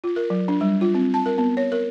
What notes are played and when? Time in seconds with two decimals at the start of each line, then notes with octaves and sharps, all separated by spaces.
0.04 F4
0.16 A#4
0.30 F#3
0.48 D4
0.61 G3
0.81 F4
0.94 C4
1.14 A5
1.26 A#4
1.38 B3
1.57 C#5
1.72 A#4